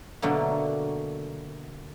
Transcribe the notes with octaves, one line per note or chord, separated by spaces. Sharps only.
B2 D3 F#3 A3 A#3